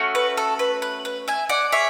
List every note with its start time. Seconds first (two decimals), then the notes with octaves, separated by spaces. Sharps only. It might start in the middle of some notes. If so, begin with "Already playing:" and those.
Already playing: A3 C#4 F#4
0.15 B4
0.37 A4
0.59 B4
0.82 B4
1.05 B4
1.28 E5 G#5
1.49 D5 F#5
1.72 G#4 C#5 E5